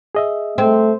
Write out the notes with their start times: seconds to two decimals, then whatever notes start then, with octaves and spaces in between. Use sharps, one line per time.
0.15 G#4 D#5 E5
0.58 A3 C4